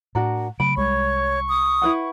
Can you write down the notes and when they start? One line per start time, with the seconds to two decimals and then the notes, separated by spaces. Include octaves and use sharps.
0.15 A2 D4 F#4 A#4
0.60 C#3 F#3 A3 B5 D7
0.77 C2 G3 G#3 C#5 C#6
1.49 D#6
1.82 E4 B4 F#5